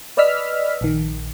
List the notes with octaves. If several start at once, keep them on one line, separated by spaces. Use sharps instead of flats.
B4 D5 D#5 E6 F6 B6
A#1 D#3